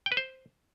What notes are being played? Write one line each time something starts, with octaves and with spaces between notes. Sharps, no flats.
G5
B4
C5